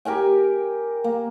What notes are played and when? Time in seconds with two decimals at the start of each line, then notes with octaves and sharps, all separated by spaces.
0.05 G4 A#4 G5 G#5
1.04 A#3